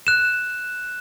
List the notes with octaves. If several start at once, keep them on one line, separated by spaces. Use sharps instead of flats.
F#6 E7